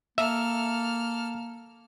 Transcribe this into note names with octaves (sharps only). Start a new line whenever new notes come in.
A#3 A4 E5 F6